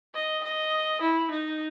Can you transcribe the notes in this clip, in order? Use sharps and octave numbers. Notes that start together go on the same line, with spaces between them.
D#5
D#5
E4
D#4